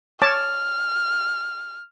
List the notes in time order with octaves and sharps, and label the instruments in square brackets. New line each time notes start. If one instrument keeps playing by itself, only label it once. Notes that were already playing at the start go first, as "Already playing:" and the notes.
[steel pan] C#5 A5 D6 [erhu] F6